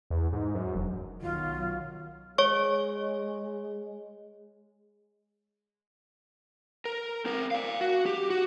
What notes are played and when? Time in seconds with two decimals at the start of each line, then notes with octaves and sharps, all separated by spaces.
0.10 E2
0.33 G#2
0.55 F#2
0.75 E1
1.22 B1 D#3 F#3 F4
2.38 G#3 C#5 C#6
6.85 A#4
7.25 C4 A#4
7.51 D5 F5
7.81 F#4
8.06 G4
8.30 F#4